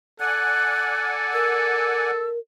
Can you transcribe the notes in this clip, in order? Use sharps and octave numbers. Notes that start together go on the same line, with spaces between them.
A4 D5 F#5 G#5 F#6
A#4 E6